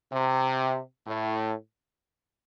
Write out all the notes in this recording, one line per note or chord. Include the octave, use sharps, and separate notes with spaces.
C3
A2